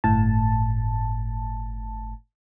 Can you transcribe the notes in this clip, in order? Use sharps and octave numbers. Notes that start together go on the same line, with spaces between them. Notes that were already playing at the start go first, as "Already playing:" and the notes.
G1 A2 A5